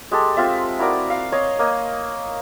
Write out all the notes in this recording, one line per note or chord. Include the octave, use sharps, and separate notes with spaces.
G#3 G4 A4
C4 F4 E5
E4 F#4 A#4 D5
F5
C#5 D#5
A#3 D#5